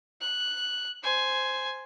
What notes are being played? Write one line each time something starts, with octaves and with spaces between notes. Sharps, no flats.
F#6
C5 G#5